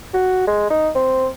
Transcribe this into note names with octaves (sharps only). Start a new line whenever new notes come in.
F#4
G#3
D#4
C4